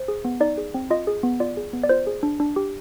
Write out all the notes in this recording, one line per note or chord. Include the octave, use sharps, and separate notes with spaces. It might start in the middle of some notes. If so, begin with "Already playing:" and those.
Already playing: C5
G#4
B3
D#4 D5
G#4
C4
F4 D#5
G#4
B3
F4 D5
G#4
B3
D5
F4 C5
G#4
D4
D4
G4